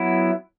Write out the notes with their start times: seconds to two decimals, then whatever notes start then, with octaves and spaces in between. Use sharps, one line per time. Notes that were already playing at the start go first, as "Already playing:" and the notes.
Already playing: F#3 B3 E4